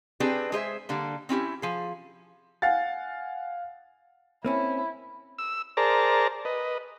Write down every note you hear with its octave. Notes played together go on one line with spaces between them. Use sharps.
C4 D4 G4 G#4 B4 D5
G#3 G#4 C5 E5
D3 G3 A#3
C4 C#4 E4 G4
F3 G#4
F5 F#5 G#5 A6
A#3 C4 C#4 E4
E6
G#4 A#4 C5 D5 A5 A#5
B4 D#5